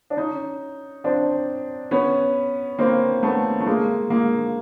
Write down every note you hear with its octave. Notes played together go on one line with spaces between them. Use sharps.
D4
C#4 D#4
C4 D4
B3 C#4
A#3 C4
A3 B3
A3
G#3 A#3
G#3 A#3